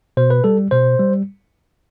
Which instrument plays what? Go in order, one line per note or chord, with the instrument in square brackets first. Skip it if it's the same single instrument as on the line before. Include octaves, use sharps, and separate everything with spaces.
[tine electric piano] B2 C5
B4
G3 A4
B2 C5
G3